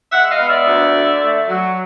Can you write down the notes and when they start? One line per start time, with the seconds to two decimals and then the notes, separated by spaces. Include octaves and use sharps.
0.12 G#3 E5 F#5
0.30 D#5 F5
0.39 B3
0.48 D5 E5
0.67 D2
0.94 D3
1.21 A3
1.48 F#3